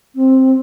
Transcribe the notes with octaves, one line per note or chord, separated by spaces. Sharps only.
C4